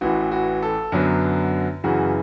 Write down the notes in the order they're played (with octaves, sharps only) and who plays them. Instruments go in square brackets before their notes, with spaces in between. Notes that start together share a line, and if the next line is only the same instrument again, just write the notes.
[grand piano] A1 A2 E3 F#4
F#4
A4
F#2 D3 F#3 B3
F#2 C#3 E3 F#4